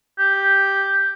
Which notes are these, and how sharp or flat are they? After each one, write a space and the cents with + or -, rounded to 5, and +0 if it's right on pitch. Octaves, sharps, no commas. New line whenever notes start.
G4 +0